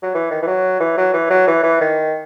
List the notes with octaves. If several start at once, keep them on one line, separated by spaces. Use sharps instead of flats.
F#3
E3
D#3
E3
F#3
E3
F#3
E3
F#3
E3
E3
D#3